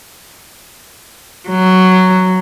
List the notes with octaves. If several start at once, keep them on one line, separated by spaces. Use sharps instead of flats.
F#3